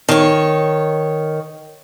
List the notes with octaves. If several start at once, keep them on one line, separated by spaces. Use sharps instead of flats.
D#3 C#5